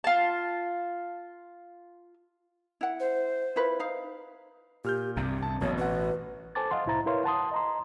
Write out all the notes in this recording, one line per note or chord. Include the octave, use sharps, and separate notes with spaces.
F4 A5
E4 F#5
C5
E4 F4 B4
D#4 F5
A#2 G4 F6 G6
C2 G2 C3 C4
A5
A1 F#2 B2 C#5
F#4 B4 F#5
A4 C5 G#5 A5 D6 A6
D#5 F5 F#5 C6
C2 A2 E4 C5 A#5 A6
E4 A#4 B4 C#5 F5 C6
F#5 A5 C6 D#6
D#5 A#5 C6